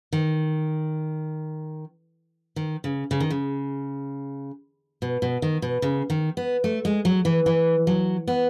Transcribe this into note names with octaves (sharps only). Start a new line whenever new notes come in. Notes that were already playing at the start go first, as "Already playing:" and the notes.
D#3
D#3
C#3
C#3
D#3
C#3
B2
B2
D#3
B2
C#3
D#3
B3
A3
G#3
F#3
E3
E3
F#3
B3